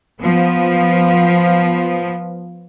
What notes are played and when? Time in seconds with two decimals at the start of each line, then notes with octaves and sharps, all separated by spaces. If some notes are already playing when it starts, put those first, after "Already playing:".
0.21 F3 B3